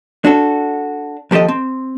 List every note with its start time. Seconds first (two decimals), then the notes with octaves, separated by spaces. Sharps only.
0.25 D4 F#4 A4
1.31 D#2 F3 G4 A4 D#5
1.48 C4